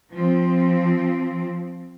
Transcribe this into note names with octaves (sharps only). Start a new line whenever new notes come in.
F3 C4